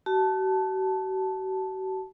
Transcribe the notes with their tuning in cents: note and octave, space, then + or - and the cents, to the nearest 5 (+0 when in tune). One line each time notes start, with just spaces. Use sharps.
F#4 +40 A5 -5